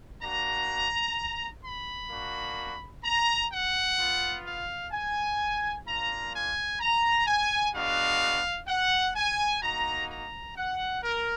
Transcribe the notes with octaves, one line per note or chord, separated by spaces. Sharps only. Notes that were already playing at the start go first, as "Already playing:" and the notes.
A#3 D4 F#4 A#5
B5
A#3 D4 F#4
A#5
F#5
B3 F4
F5
G#5
A#3 D4 F4 A#5
G#5
A#5
G#5
G#3 B3 D4 F#4 F5
F#5
G#5
A#3 D#4 F#4 A#5
A#5
F#5
A#4